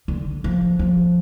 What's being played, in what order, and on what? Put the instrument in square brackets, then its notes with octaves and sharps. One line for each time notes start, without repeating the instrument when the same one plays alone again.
[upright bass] D3
F3
F3